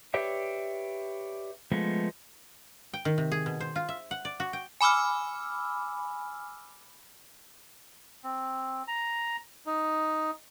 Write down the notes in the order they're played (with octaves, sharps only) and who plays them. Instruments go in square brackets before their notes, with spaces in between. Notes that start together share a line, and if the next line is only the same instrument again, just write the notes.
[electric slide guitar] G4 B4 C#5 D5 E5
F3 G#3 A3 B3
[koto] G5
D#3
C3
G#4
B2
C5
F4
E5
F#5
D5
F#4
G5
[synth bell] G#5 B5 D6 E6 F6
[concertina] C4
A#5
D#4